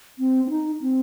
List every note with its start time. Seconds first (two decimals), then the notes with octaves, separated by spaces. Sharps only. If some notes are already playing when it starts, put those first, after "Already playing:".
0.19 C4
0.45 C4
0.50 D#4
0.82 C4